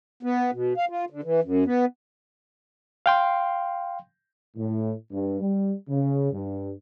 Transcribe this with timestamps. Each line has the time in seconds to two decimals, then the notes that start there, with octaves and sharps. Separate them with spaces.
0.23 B3
0.52 B2
0.77 F5
0.89 F4
1.10 D3
1.23 E3
1.43 F#2
1.66 B3
3.06 F5 G5 C6
4.57 A2
5.12 G2
5.41 G3
5.88 C#3
6.33 G2